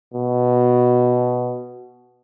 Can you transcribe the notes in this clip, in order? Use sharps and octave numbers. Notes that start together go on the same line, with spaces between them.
B2